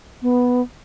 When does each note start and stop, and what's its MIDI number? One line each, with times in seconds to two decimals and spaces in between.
0.22 0.62 59